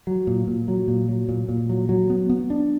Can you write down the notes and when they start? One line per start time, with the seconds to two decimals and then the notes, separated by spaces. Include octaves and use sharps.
0.07 F#3
0.27 A#2
0.47 A#2
0.68 F#3
0.88 A#2
1.09 F#3
1.29 A#2
1.49 A#2
1.69 F#3
1.89 F#3
2.10 B3
2.30 B3
2.50 D4